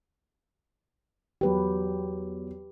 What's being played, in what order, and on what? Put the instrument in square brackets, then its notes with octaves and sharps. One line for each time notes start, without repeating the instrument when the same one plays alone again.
[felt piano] E2 F#3 [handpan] G4 B4